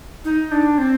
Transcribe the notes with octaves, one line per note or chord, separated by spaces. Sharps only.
D#4
D4
C4